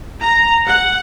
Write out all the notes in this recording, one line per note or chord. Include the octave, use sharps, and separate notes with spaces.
A#5
F#5